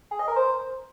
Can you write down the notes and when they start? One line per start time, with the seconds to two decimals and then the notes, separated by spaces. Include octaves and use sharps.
0.11 G#4
0.19 D#5
0.28 A#4
0.36 C5